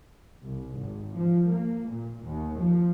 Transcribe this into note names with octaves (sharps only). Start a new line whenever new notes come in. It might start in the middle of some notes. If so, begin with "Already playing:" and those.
C2
G#1
F3
A#3
A#2
D#2
F3